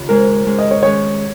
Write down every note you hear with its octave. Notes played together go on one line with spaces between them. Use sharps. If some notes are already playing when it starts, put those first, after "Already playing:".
Already playing: D#2 C#3 F4
G#2 G#3 C#4 G#4 A#4
G#2 G#3 C#4 G#4
D#5
C#5
D#3 G#3 C#4 C#5